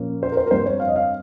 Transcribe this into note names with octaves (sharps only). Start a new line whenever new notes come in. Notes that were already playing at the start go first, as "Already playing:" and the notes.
Already playing: A#2 F3 A#3 C#4 A#4
C5
A#4
C5
A#4
G2 G3 C4 C5
C#5
F5
D#5
F5